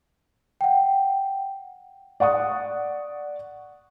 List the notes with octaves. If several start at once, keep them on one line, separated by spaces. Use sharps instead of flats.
F#5 G5
D5 F#5 C#6 D#6